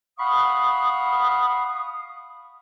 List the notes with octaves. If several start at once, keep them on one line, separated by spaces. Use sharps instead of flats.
F5 F#5 B5 C#6 D#6